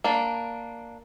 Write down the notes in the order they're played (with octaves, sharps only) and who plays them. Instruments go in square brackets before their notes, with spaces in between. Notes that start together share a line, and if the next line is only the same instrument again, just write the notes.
[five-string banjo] A#3 D4